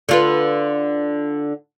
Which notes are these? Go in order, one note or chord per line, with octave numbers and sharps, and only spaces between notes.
D3 F4 B4